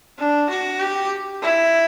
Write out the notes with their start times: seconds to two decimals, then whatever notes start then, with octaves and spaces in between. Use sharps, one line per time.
0.18 D4
0.49 F#4
0.80 G4
1.41 E4